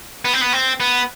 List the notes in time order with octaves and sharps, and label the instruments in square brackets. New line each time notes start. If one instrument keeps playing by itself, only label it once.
[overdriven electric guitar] B3
C4
B3
C4
B3